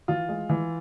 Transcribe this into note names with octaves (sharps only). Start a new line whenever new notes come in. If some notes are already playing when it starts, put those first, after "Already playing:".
E3 F4
G#3
E3